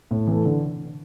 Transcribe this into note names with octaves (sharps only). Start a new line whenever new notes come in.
A2
E3 A3
D3